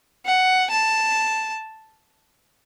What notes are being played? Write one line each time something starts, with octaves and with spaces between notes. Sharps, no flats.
F#5
A5